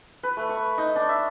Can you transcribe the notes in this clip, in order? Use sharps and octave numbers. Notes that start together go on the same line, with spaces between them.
B4
A3
C#6
D#4
D4
E5